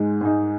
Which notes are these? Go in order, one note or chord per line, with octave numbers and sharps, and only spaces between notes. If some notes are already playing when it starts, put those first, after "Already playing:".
Already playing: G#2 G#3 D#4
G#2 G#3 D#4